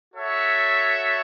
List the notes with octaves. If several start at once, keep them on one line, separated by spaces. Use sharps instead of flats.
F#4 A4 C#5 E5